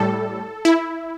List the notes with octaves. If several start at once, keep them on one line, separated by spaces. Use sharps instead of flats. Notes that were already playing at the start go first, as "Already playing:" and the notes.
Already playing: A2 G3 A4
E4